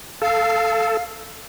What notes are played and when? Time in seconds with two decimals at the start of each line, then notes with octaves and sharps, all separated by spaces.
0.22 A4 F5